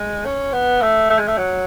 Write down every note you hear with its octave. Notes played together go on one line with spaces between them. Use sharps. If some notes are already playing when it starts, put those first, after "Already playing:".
Already playing: G#3
C#4
B3
A3
A3
G#3
A3
F#3